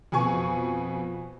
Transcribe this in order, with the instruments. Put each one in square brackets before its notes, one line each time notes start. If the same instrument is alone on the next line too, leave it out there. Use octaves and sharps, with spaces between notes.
[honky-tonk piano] F2 B2 G#5 C#6